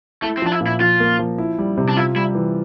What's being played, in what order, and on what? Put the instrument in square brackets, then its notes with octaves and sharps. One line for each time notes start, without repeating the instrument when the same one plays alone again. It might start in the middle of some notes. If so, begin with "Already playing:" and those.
[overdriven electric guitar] A3 [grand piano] E4
[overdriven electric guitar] C4
[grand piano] F3 [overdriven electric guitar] D4
[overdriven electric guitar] E4
[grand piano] A#2
[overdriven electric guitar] E4
[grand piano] F3 [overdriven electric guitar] F4
[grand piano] A#3
F3
E4
G3
C3
[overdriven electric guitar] D4
[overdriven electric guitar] E4 [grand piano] F4
[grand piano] G3 [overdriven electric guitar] E4
[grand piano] E3